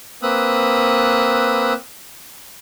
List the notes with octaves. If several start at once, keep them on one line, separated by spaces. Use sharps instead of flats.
A#3 C4 B4 D#6 E6 F#6